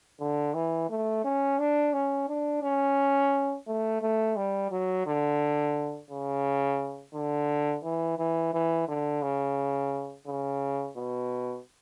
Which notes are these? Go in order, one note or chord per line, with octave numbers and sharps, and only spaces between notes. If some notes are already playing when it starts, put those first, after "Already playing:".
D3
E3
A3
C#4
D4
C#4
D4
C#4
A3
A3
G3
F#3
D3
C#3
D3
E3
E3
E3
D3
C#3
C#3
B2